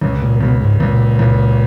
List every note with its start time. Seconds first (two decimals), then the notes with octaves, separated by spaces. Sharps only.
0.01 C#2 C#3
0.22 A#2
0.41 C#2 B2
0.61 G#2
0.80 C#2 A#2
1.19 C#2